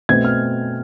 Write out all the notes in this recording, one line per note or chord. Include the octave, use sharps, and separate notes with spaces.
B2 A3 C4 G#6
F6